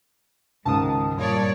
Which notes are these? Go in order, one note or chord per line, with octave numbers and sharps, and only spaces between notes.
C#2 G#2 D#3 G#3 A5 D#6
G2 A#2 C#5 D5